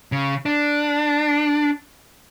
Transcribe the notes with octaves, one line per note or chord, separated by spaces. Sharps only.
C#3
D4